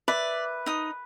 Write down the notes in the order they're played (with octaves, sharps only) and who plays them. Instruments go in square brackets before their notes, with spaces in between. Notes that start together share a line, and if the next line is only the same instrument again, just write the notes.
[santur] B4 [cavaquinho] D5 [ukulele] E5
[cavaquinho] D#4 D#6